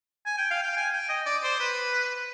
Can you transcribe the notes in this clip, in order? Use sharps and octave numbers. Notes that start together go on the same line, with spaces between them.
G#5
G5
F5
G5
G#5
G5
D#5
D5
C5
B4